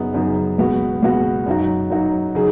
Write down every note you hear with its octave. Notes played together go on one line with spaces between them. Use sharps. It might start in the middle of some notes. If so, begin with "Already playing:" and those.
Already playing: F#2 C#3 B3 D#4 G#4
F#2 C#3 B3 D#4 G#4
C#2 B2 B3 F#4
C#2 B2 B3 F#4
F#2 F#3 D#4 F#4
F#2 F#3 D#4 F#4
C#3 F#3 D#4 G#4